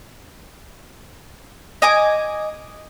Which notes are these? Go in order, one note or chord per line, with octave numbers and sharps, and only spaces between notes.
D#5 G#5 D6